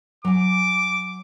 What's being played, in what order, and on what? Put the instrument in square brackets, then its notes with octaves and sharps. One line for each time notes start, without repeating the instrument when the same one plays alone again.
[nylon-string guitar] F#3 G#5 [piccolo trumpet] D6